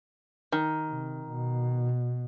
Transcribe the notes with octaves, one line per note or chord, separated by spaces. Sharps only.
D#3
C3
B2